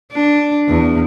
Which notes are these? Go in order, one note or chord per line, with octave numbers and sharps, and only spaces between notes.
D4
E2